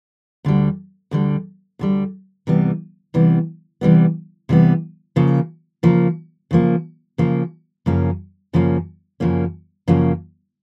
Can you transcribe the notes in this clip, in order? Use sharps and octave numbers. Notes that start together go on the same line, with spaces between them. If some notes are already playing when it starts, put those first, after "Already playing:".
D2 D3 G3
D2 D3 G3
D2 D3 G3
C3 E3 G3 B3
C3 E3 G3 B3
C3 E3 G3 B3
C3 E3 G3 B3
C#3 F3 A#3
C#3 F3 A#3
C#3 F3 A#3
C#3 F3 A#3
F#2 C#3 F3 A#3 C#4
F#2 C#3 F3 A#3 C#4
F#2 C#3 F3 A#3 C#4
F#2 C#3 F3 A#3 C#4